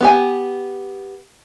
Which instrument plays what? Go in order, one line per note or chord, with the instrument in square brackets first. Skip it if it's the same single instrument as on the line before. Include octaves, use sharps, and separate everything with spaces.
[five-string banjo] B3 G4 G#5